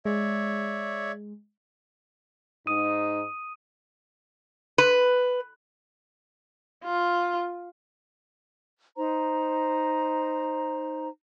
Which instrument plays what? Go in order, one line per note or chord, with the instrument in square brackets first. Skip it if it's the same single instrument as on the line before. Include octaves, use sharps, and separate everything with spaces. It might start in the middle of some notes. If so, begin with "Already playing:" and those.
[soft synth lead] G#3 [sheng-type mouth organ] C#5 D5 E5
[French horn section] G#2 D#4 [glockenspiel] D#6 D#7
[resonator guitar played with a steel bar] B4
[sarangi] F4
[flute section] D#4 C5 A#5